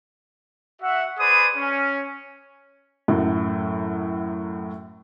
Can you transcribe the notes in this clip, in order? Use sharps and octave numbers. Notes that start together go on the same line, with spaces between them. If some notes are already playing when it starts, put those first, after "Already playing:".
F#4 E5 F#5
G#4 B4 C5 D5 B5 D#6
C#4
F#2 A2 F#3